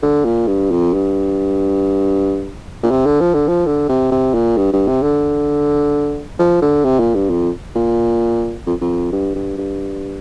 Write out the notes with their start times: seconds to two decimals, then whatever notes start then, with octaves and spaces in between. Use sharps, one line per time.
0.03 D3
0.25 A#2
0.47 G2
0.71 F2
0.93 G2
2.83 A#2
2.91 C3
3.06 D3
3.21 F3
3.34 D3
3.48 F3
3.66 D3
3.89 C3
4.11 C3
4.34 A#2
4.57 G2
4.73 G2
4.88 C3
5.02 D3
6.39 F3
6.62 D3
6.85 C3
7.00 A#2
7.15 G2
7.30 F2
7.75 A#2
8.67 F2
8.81 F2
9.12 G2
9.35 G2
9.57 G2